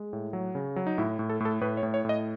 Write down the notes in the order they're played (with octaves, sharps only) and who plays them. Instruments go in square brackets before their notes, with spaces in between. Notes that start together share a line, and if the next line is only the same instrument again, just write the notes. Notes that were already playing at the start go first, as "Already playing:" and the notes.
Already playing: [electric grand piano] G#3
A2
F#3
C#3
F#3
D#4
A2 E4
A2
A4
A2 A4
A2 B4
C#5
A2
C#5
A2 D#5